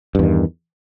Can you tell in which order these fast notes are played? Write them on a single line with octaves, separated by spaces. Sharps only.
G2 E2 D#3